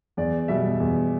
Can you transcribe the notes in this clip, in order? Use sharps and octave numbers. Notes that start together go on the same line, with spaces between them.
E2 D5
B2 G3 E5
E2